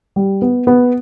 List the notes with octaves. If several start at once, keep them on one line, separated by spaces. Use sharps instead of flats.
G3
B3
B3